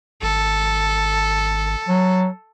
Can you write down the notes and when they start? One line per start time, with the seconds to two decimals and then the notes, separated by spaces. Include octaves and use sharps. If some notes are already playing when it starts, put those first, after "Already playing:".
0.22 G#1 A4
1.89 F#3